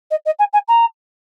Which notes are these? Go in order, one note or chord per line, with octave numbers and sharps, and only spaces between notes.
D#5
D#5
G#5
G#5
A#5